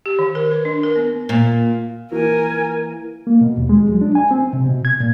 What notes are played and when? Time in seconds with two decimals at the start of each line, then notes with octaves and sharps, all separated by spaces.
0.06 G4
0.19 D#3
0.35 A#4
0.51 B4
0.65 D4
0.83 A#4
0.96 B3
1.29 A#2
2.12 E3 A#3 A#4 G#5
3.27 A#3
3.41 B2
3.58 D#2
3.69 G#3
3.89 F#3
4.01 D4
4.15 G#5
4.31 C4
4.53 C3
4.66 B2
4.85 G#6
5.00 A#2